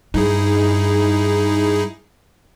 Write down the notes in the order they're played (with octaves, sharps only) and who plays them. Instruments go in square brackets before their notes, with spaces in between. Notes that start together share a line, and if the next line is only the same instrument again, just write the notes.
[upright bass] G2 [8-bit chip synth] D#4 E4 G#4